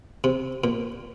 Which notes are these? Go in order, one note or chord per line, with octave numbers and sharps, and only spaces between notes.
C3
A#2